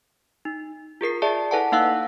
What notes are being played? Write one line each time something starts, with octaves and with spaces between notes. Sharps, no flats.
D#4
F4 G#4 A#4 C7
G#4 D5 E5 A5
E4 A4 B4 F#5 G#5 A5
A#3 D#4 F5 F#5 E6 F#6